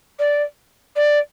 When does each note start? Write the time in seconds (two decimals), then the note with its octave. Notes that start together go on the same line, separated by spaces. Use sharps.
0.19 D5
0.96 D5